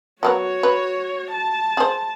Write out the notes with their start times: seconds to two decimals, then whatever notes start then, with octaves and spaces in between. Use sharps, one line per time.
0.23 F#3 B3 F#4 A#4 C#5
0.63 B4
1.32 A5
1.77 G#4 C5